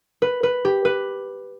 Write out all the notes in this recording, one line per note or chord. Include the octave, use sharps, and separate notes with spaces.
B4
B4
G4
B4